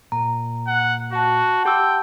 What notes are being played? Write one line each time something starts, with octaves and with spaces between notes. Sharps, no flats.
A#2 A#5
F#5
F#4 F#5 A5
G4 G5 D6 E6